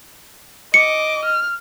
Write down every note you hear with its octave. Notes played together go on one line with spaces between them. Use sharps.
D#5 D6 C#7
F6